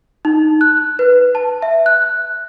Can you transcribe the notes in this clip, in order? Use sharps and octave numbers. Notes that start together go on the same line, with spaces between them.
D#4
F#6
B4
A5
E5
F#6